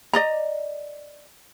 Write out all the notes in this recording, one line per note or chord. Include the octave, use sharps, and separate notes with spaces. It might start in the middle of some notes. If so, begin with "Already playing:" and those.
D5 D#5 A#5